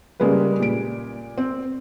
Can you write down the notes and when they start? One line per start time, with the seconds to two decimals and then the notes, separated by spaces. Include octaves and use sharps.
0.20 C#3 G3 G#3 A#3 B4
0.60 A#2 D7
1.38 C4